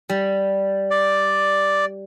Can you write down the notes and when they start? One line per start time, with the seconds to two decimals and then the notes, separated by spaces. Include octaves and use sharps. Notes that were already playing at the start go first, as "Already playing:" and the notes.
0.09 G3
0.91 D5